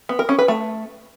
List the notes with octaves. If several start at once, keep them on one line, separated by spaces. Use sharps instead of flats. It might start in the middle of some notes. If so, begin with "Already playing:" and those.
B3
A#4
C#4
B4
A3